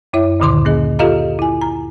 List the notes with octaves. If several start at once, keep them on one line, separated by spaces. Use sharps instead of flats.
F#2 E4 C#5 E5
D2 A#2 D3 D#3 C6 D6
A#3 C#4 G#4 D#5
F4 G4 A4 D#5 F5 A#5
E4 G#5
A#5